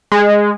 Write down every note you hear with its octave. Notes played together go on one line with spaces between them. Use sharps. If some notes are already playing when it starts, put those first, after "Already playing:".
G#3